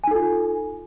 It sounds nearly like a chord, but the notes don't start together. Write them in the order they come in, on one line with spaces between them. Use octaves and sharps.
G#5 D#4 A4 F4